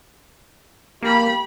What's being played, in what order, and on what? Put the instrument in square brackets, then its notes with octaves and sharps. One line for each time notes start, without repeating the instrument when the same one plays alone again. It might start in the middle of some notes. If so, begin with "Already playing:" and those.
[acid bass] A#3 [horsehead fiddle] G4 B5